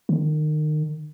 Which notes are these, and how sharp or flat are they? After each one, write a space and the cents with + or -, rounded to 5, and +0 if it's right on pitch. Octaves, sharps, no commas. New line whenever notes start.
D#3 -30